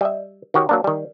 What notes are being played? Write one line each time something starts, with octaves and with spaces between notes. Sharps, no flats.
G3 D#5 E5
D#3 F#4 G4 C#5
F#3 A#3 D4
D#3 G3